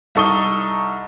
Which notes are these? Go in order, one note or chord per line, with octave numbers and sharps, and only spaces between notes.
C2 D#4 A4 C#6 D#6 G7